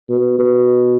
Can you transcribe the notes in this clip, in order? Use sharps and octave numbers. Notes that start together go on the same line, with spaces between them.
B2
B2